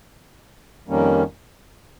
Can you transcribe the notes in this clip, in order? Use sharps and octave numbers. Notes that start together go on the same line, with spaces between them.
F2 D#3 G3 A#3 C#4